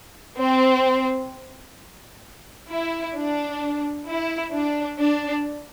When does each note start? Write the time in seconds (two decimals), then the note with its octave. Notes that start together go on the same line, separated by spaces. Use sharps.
0.38 C4
2.69 E4
3.14 D4
4.07 E4
4.53 D4
4.99 D4